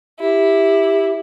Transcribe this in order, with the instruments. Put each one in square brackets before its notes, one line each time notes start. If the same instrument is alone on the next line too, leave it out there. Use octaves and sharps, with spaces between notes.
[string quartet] E4 [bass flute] G4